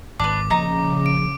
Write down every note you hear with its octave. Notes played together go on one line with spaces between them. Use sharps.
G#1 D4 B4 D6
A#1 C#3 F3 A#3 D#4 A#5
D7